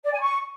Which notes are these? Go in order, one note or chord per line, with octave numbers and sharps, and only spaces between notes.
D5
G#5
C#6